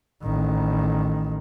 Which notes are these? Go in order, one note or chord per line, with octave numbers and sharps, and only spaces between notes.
A1 D#3